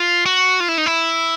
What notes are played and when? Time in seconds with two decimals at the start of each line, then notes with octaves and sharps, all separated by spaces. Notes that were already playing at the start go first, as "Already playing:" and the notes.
Already playing: F4
0.26 F#4
0.60 F4
0.68 E4
0.78 D#4
0.86 E4